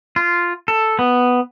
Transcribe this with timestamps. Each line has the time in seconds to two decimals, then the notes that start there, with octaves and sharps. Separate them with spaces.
0.16 F4
0.68 A4
0.99 B3